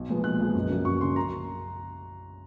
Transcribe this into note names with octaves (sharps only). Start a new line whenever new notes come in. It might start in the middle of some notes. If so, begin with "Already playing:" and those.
Already playing: B1
A#2 F3 G#3 B3
B1 F#6
A#2 F3 G#3 B3
F#2
C#3 F#3 A#3
F#2 C#6
C#3 F#3 A#3 C6
A#5